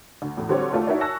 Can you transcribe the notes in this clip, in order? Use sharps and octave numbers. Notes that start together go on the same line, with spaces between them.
D2
E2 A2
D3 F#3 G3 C4 G4 C#5
D#2 A3 F4 D5 A5
D#4 E4 F#4 A#4 C#5 D5
G#5 A5 C#6 E6 F#6 A#6